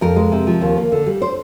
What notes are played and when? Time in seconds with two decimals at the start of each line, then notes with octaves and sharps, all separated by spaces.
0.01 F2 A#4
0.16 G#3
0.32 C3
0.47 F3
0.61 D#2
0.77 A#3
0.92 D3
1.06 G3
1.22 C5